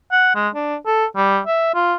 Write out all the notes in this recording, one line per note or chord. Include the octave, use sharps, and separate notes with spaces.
F#5
G#3
D4
A4
G3
E5
F4